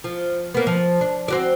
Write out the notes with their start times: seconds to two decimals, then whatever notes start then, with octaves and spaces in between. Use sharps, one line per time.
0.04 F3
0.54 A#3 B3
0.67 F3
1.01 D4
1.28 C4 F#4 D5